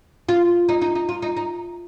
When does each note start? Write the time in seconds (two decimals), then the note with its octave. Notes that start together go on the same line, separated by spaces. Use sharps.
0.29 F4
0.69 D#4
0.82 D#4
0.95 D#4
1.09 F4
1.22 D#4
1.37 D#4